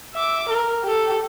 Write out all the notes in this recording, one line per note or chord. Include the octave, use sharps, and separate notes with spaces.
E5 D6
A#4
G4 A4